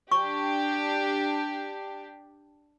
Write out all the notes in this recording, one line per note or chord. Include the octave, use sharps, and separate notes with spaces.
D4 G4 C#6